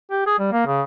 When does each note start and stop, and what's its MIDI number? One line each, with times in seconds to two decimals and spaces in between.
0.11 0.22 67
0.26 0.38 68
0.39 0.49 55
0.53 0.63 58
0.66 0.82 49